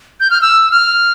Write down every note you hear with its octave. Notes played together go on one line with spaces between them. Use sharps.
G6
F6
E6
F6